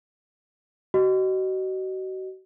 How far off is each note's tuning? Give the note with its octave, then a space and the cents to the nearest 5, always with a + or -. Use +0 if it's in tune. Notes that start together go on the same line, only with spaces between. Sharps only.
F#4 +35 D#5 -20